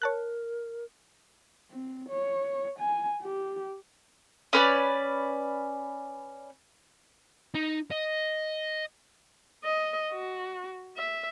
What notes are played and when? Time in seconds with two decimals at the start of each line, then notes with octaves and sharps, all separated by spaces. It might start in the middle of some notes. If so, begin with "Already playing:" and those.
0.02 A#4 C#5 A5 F#6
1.71 C4
2.09 C#5
2.79 G#5
3.22 G4
4.53 C#4 B4 D5
7.55 D#4
7.92 D#5
9.64 D#5
10.11 F#4
10.97 E5